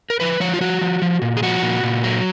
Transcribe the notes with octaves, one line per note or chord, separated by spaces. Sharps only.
A#4
F3 B4
F3 C#5
F4
F3 F#4
F3
F3
A#2
G#4
F3 F#4
A#2
A#2
F#3